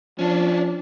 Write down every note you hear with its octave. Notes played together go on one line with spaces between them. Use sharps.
F3 C#4 D4